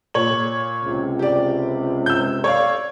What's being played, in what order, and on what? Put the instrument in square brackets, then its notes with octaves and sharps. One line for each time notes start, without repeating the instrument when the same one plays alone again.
[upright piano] A#2 C#5 F#7
[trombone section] C#2 C3
[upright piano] G4 D5
E6 G6
C#5 D5 F5